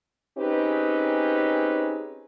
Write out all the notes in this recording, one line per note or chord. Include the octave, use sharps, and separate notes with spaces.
C4 C#4 D#4 G4 G#4 B4